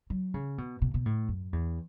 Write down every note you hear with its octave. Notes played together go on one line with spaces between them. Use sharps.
F#3
C#3
B2
B2
B2
A2
F#2
E2